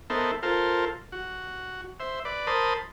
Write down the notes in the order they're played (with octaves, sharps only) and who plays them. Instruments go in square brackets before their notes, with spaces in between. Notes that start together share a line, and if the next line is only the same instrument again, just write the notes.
[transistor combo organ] B3 D#4 A4 A#4 C5 E5
F4 A4 A#4 C5
F#4
C5 E5
B4 D5
A#4 C5 A5 B5 D#6